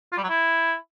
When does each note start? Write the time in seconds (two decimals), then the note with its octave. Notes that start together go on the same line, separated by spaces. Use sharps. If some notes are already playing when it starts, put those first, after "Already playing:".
0.12 F4
0.18 G3
0.24 F#3
0.29 E4